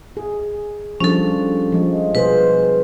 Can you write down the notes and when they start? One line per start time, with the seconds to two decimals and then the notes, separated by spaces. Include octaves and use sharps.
0.17 G#4
1.00 F3 G3 C#4 D4 A4
1.72 F3 G#3
2.15 B2 G#4 B4 C5